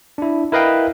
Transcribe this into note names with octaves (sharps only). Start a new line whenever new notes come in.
D4 E4
E4 A#4 B4 D#5 F5 G5